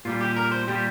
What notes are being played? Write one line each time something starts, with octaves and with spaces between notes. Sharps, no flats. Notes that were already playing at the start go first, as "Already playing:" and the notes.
A#2 G3 F4
G4
A#4
C5
A#2 G3 G4